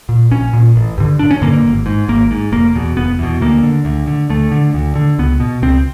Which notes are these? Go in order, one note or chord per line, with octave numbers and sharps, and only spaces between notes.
A#2
A#1 C#4
A#2
A1
G2 D3
A1 D4
C#4
G2 D3 A#3
A#3
G#1
G#2
G#1 A#3
G#2
F1 A#3
E2 B2
F1 B3
E2 B2
D2 A#3
D3
D2
D3
D2 A3
D3
D2
D3
C#2 B3
B2
C#2 C4